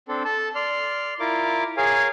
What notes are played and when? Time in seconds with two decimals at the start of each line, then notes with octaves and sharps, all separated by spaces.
0.08 C4 D4 A4
0.25 A4 A5
0.55 D5 C6 F6
1.20 E4 F4 A#4 D6
1.77 G#4 A#4 C#5 F5 G#5